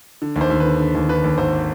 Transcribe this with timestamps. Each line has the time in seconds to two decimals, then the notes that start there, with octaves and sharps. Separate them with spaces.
0.22 D3
0.36 D#2
0.41 C5
0.50 D#2
0.60 B4
0.65 D3
0.80 D3
0.95 D#2
1.09 D3 B4
1.24 D#2
1.38 G#1 C5